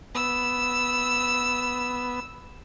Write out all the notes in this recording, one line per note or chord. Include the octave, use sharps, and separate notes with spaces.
B3 E6